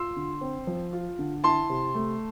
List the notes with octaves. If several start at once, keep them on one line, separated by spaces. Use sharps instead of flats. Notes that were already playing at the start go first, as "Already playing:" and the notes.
Already playing: F4 C6 E6
D3
C4
F3
F4
D3
E4 A5 C6
C3
A3